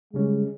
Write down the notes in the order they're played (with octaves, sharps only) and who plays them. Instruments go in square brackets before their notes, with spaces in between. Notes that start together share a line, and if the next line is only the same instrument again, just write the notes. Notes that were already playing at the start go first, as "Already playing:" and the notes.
[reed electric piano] C#3 G3 C#4 [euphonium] G#3